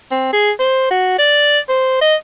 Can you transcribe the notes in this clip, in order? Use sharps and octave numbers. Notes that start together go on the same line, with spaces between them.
C4
G#4
C5
F#4
D5
C5
D#5